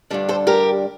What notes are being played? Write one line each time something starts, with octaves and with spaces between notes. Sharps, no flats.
G2 D3 G3 D4
A4 C5
G4 A#4